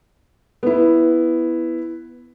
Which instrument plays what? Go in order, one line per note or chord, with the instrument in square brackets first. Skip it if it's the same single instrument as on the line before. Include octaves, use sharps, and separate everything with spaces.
[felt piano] B3 E4